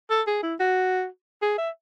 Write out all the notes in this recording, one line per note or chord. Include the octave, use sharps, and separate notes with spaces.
A4
G#4
E4
F#4
G#4
E5